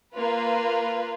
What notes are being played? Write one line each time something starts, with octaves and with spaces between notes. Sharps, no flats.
A#3 F4 B4